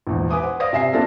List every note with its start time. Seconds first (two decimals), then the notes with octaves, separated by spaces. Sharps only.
0.07 A#1 E2 G#2
0.30 B4 G#5 D6 D#6
0.43 C5 F#5
0.60 C5 D5 F5 D#6 A#6
0.73 C3 E5 G#5 C7
0.93 A#3 C4 D4 F4 A4 A#4